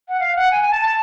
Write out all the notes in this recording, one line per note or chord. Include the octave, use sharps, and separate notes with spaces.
F#5
F5
F#5
G#5
G#5
A5
A5